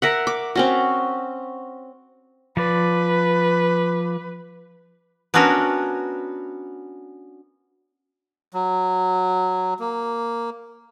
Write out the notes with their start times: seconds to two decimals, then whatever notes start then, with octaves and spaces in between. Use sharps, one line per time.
0.02 A#4 E5 F#5
0.27 D6
0.55 C4 C#4 F#4
2.57 F3 B4 D5
5.34 B3 C#4 D4 F#4 A#4 B4
8.54 F#3
9.79 A#3